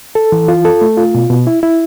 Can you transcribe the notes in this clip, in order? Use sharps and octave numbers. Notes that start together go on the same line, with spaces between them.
A4
E3
F4
A4
A3
F4
B2
B2
E4
E4